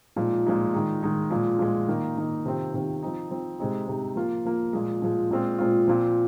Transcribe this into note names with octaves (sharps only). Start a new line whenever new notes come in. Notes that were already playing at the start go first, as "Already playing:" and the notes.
A#2 F3 G#3 D#4
A#2 F3 G#3 D#4
D#3 G#3 D#4
D#3 G#3 D#4
A#2 F3 G#3
A#2 F3 G#3
D#3 A#3 D#4
D#3 A#3 D#4
C3 D#3 C4 F4
C3 D#3 C4 F4
F3 C4 D#4
F3 C4 D#4
C3 G#3 C4 D#4
C3 G#3 C4 D#4
F3 A#3 F4
F3 A#3 F4
A#2 F3 G#3
A#2 F3 G#3
A#2 G#3 C4 F4
A#2 G#3 C4 F4
A#2 F3 C4